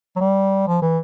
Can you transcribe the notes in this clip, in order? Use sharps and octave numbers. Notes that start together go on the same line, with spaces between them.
F#3
G3
F3
E3